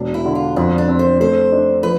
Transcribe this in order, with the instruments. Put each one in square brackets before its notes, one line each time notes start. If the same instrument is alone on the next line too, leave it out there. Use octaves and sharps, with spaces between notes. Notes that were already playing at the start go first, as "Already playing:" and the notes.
Already playing: [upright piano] E1 D4
[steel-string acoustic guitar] E4
[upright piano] D3
[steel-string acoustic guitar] F4
[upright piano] F2 [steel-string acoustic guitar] D4
[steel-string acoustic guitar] D4
[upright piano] C4
[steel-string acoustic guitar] C5
[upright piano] A3 [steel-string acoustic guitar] C5
[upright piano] D4
[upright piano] F3 [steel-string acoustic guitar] B4